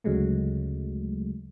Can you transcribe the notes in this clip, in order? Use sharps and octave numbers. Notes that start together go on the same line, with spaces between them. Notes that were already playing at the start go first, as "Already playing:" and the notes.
D2 C#3 F#3 G#3 A3